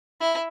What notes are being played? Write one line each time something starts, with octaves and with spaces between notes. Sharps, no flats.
E4